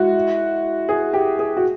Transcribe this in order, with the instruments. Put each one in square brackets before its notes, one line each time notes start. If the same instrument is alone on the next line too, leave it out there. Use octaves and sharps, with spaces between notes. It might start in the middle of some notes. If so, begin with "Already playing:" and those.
Already playing: [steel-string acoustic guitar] G#3 E4 [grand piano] F#4
[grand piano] G#4
G4
G#4
F#4